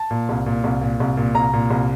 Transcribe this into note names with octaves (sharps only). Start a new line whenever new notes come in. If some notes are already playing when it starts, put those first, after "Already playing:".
Already playing: A5
A#2
C2
A#2
C2
A#2
C2
A#2
C2 A#5
A#2
C2